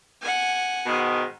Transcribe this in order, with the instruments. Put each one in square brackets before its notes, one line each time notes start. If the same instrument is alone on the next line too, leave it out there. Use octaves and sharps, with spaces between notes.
[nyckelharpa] F#5 G#5
[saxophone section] G#2 B2 D#3